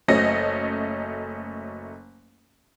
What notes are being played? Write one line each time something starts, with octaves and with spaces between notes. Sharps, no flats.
F#1 F#3 A3 C#4 D#5 A#6